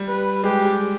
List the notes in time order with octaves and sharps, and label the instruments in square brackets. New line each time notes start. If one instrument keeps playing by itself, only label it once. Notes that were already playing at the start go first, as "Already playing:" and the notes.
Already playing: [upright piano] G3
[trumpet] B4
[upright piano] G#3 [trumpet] G4
[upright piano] G3